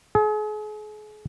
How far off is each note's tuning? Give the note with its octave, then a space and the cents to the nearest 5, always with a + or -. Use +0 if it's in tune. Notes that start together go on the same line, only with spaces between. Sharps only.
G#4 +40